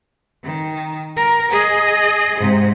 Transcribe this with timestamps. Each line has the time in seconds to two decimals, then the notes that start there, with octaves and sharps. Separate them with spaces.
0.44 D#3
1.17 A#4
1.52 G#4 D#5
2.39 G#2 C3